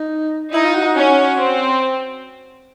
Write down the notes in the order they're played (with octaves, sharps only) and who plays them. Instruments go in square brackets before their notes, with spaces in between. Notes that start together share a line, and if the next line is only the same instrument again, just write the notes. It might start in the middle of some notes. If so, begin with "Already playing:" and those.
Already playing: [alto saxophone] D#4
[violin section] D#4 [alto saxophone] E4
[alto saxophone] F4
F#4
F#4
[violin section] C#4
C4